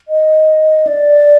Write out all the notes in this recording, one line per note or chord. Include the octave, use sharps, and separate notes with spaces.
D#5
D5